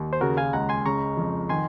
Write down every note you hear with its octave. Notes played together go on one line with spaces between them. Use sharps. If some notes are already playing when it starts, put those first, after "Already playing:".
Already playing: D#2
C5
C#3 F#4 A#4
F5 G#5
C#2 F#5 A#5
G#5 C6
C#3 A#5 C#6
F2
D#3 G#5 C6